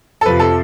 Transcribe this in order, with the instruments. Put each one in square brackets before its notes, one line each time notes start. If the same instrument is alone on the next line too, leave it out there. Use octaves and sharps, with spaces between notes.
[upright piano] A4
[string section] F2 C3 F3 [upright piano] B4
[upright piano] A4